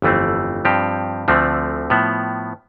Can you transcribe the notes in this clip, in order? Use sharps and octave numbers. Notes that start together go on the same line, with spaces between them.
G1 F2 E3 A3 C4
G2 F3 C4 G4
D2 D3 F3 A3 C4
A2 F3 B3